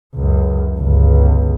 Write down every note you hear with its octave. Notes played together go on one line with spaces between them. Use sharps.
C#2 F#2
G1 C#2